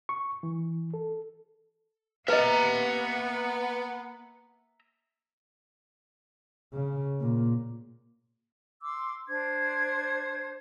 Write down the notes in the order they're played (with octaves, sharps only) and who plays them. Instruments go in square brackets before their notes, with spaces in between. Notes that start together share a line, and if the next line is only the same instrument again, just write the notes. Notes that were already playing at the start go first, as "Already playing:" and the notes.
[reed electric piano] C#6
E3
A4
[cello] A#3 F#5 [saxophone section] B3 [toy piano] B4 D#5 [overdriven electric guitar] E5 A#5
[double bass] C#3
A#2
[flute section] C6 D6 E6
D4 C5 G#6